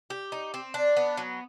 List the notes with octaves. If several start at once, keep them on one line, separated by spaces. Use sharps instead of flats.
G4
D#4
C4
D4
B3
F#3